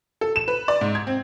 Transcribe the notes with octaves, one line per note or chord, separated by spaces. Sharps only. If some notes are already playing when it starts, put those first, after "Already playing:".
A4
E7
B4
D5
G#2
G#6
C4